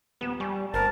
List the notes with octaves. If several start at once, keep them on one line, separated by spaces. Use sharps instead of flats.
D#1 B3 E7
G3 G#5 C#6
G1 G3 A#4 C5 A5